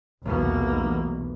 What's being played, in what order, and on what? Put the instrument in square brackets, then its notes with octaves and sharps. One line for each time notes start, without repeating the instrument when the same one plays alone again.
[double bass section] F1 B1 E2 [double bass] B2 A#3